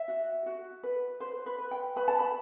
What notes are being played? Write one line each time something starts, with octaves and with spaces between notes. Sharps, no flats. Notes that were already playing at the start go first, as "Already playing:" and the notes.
Already playing: E5
F#4
F#4
B4
B4 C5
B4
B4
G5
B4 B5
A5
B5